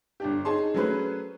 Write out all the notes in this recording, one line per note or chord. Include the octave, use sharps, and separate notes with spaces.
G1 D4 G4
D#4 G#4 C#5 A5 C6
F#3 A3 C#4 G#4 B4 C5